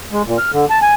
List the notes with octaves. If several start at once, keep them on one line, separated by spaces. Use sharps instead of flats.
G#3
A#2
F6
D3
A5
G#5